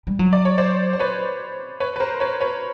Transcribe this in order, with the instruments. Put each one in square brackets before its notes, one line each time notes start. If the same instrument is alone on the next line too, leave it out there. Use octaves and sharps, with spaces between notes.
[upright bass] G3
F#3
[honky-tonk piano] D5
C#5
C5 D5
C5
B4 C#5
B4 C#5
B4
A#4 C5
B4 C#5
B4 C#5